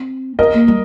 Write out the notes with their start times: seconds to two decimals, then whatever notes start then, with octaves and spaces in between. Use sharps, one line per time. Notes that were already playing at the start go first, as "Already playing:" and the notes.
Already playing: C4
0.39 C4 A#4 D#5
0.54 A#3
0.68 G3